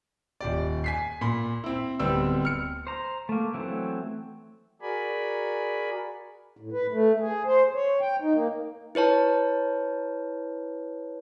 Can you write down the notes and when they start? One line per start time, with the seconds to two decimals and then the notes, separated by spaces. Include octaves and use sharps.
0.41 D#1 G4 D5
0.84 G#5 B6 C7
1.21 A#2 B5
1.64 C4 E4
1.99 D1 G3 B3 C4 G4 E6
2.45 F6 C#7
2.87 C5 A#5
3.29 A3 A#3
3.54 E3 F#3 A3 C4
4.82 F#4 G#4 A#4 D5 G#5 B5
6.57 A2
6.72 B4
6.92 A3
7.20 G#4
7.45 C5
7.74 C#5
8.01 G5
8.22 D#4
8.34 A#3
8.95 E4 B4 C#5 A5